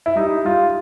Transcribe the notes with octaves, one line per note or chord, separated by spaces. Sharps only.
E4
G3 D#4
G3 F4